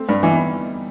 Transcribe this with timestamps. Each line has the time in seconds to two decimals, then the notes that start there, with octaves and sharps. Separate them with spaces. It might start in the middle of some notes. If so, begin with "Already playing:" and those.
Already playing: A3 C4
0.09 G2
0.23 E3 B3 D#4
0.33 G3 B3